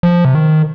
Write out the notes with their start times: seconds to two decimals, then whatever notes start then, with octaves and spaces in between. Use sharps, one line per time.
0.03 F3
0.25 C3
0.35 D#3